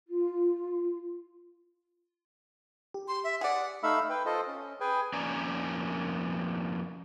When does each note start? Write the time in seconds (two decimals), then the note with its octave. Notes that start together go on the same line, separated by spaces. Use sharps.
0.08 F4
2.94 G4
3.08 C6
3.24 E5
3.41 G#4 D5 F#5
3.83 A3 D#4 E5 F5 B5 E6
4.09 B4 G5
4.26 F4 A4 C5 D#5
4.48 C#4
4.80 G#4 B4 G5 G#5
5.13 F2 A#3 C#4 D5 G#5 A#5